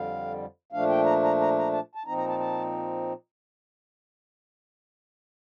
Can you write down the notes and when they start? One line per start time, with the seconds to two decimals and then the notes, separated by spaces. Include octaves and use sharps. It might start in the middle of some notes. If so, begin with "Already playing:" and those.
Already playing: F2 D3 G3 F5
0.72 A#2 F3 A3 D4 F5
0.89 G5
1.05 A#5
1.23 A#5
1.41 A#5
1.58 A#5
1.73 A5
1.95 A5
2.06 A#2 F3 C4 D#4 A#5
2.17 A#5
2.28 A5
2.39 A5